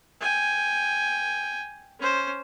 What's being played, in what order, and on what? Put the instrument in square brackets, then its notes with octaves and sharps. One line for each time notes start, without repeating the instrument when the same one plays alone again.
[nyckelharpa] G5 G#5
C#4 C5